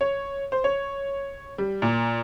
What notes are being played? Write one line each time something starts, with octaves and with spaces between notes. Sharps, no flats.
C#5
C5
C#5
G3
A#2